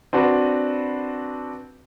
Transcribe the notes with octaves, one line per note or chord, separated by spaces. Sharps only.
C4 D4 F#4 B4